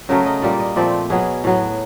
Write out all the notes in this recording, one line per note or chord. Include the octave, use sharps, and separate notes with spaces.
C#3 F#3 A3 A#4
D#5
A#2 G3 A#3 D5
D#5
A#2 F3 A3 C4 D5
B2 F#3 B3 G#4
A2 F#3 B3